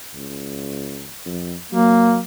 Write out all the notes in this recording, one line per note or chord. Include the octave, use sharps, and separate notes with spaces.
C#2
F2
F#3 A#3